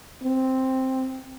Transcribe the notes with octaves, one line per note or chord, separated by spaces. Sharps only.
C4